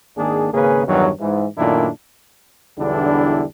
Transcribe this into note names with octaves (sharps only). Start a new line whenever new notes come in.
G#1 D#3 A#3 D4 G#4
G#1 C#3 A#3 C#4 G#4 B4
E2 G2 D#3 F#3
G#2 E3
F#2 A#2 D#3 A3 D4 E4
B1 E2 D3 G3 D4 E4